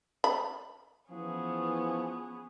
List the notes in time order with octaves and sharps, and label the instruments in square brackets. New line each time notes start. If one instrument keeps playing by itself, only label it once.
[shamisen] B5
[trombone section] E3 F3 [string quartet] B3 C#4 G#4